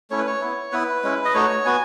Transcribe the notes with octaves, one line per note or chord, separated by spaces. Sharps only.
A3 C#4 E4 C#5
B4
C#5
B3 E4
B3 E4 B4
G#3 C#4 E4
D#5
A3 D#4 F#4 C#5
B3 F#4 G#5